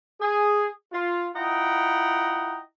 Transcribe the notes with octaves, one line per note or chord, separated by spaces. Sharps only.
G#4
F4
E4 F4 D#5 F#5 G5 A#5